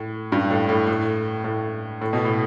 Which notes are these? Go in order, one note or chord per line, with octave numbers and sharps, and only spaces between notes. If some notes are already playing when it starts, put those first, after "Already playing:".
Already playing: A2
G2
A2
A2
A2
A2
A2
B2
A2